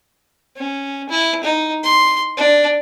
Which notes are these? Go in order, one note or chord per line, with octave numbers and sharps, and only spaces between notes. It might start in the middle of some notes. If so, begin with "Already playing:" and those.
C#4
E4
D#4
C6
D4